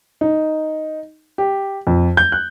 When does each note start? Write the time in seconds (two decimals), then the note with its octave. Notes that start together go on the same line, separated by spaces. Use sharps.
0.21 D#4
1.38 G4
1.87 F2
2.17 G6
2.32 F#6